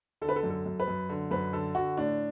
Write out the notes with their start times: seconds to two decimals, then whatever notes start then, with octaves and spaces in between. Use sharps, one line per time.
0.22 D3 A4
0.29 B4
0.36 A4
0.43 F#2
0.50 A4
0.66 F#2
0.80 B4
0.88 F#2
1.09 D3
1.31 F#2 B4
1.53 D3 A4
1.75 D3 F#4
1.97 A2 D4